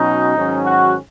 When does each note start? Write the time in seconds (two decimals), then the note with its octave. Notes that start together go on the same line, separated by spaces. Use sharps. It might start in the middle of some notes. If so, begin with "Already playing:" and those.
Already playing: B2 F#3 C#4 D#4
0.35 G#2 D#3 F#3 C#4
0.66 F#4